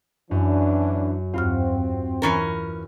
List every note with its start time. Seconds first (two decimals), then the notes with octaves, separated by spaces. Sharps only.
0.31 F#2 E3 C#4 D4
1.34 E2 G2 C4 F4 F#4 F6
2.22 E3 C#4 A#4